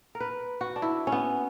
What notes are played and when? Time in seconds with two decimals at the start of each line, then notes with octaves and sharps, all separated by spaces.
0.15 A#4
0.20 B4
0.61 F#4
0.76 D4
0.82 E4
1.07 C#4
1.12 B3